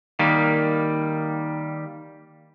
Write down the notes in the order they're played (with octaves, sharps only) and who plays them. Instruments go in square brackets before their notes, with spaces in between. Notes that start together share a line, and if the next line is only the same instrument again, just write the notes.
[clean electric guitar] D#3 G3 A#3